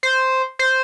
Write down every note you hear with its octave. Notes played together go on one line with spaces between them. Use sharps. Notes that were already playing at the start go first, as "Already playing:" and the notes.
C5
C5